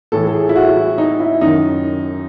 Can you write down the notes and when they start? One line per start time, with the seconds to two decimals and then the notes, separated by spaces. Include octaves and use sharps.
0.12 A2 E3 A4
0.27 A4
0.34 G#4
0.49 E4
0.56 F#4
0.77 E4
0.98 D#4
1.20 E4
1.41 F#2 D#3 D#4